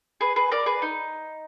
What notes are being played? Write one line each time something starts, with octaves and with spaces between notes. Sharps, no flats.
G#4 B4
G#4 B4
A#4 D5
G#4 B4
D#4